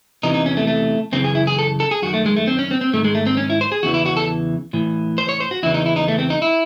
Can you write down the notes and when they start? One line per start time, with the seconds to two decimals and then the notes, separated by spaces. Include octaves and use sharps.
0.23 E2 C3 E3 D#4
0.34 D#4
0.46 C#4
0.57 A3
0.67 A3
1.12 F#2 C#3 E3 C4
1.24 G#4
1.35 E4
1.47 G#4
1.59 A4
1.80 A4
1.91 G#4
2.02 F#2 D#3 F#4
2.14 A3
2.26 G#3
2.36 A3
2.48 C4
2.59 C#4
2.71 C4
2.81 C4
2.93 G#2 D#3 A3
3.05 G#3
3.15 A3
3.27 C4
3.37 C#4
3.50 E4
3.61 C5
3.72 G#4
3.83 E2 C#3 E3 F#4
3.94 E4
4.06 F#4
4.17 A4
4.73 A2 E3
5.18 C5
5.29 C#5
5.40 C5
5.51 F#4
5.63 E2 C#3 E3 E4
5.74 D#4
5.86 E4
5.96 D#4
6.08 A3
6.19 C4
6.30 D#4
6.42 E4